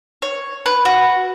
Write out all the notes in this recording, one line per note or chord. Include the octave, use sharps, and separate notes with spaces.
C#5
B4
F#4